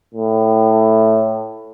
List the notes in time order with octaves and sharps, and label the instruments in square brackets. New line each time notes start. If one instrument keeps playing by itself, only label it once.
[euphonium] A2